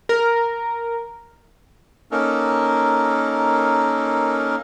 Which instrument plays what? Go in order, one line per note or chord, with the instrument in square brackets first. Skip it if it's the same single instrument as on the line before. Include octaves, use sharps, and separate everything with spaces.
[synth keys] A#4
[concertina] A#3 C#4 D#4 A4 A#4